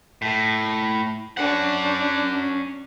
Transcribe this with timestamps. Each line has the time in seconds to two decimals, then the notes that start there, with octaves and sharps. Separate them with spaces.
0.22 A2
1.37 C#4 D4 F#5